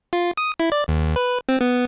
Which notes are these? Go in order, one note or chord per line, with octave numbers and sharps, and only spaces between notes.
F4
D#6
E4
D5
D#2
B4
C4
B3